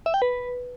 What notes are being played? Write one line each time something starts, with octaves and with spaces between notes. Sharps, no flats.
E5
G5
B4